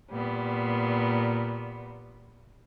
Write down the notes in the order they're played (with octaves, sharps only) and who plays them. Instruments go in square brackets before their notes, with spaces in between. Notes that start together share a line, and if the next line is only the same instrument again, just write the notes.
[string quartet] A#2 G3 B3